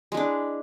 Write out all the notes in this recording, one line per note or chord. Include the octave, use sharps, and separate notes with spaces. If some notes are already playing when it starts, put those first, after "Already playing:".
G#3 D4 E4